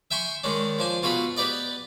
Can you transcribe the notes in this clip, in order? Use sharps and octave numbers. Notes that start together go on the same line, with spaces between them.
E5 G5 G#5 C6 C#6
D#3 G#3 C#4 D4
F3 D4 G#5
B2 F4 F#4 G#4 B5
B3 G4 B4 D5 D#5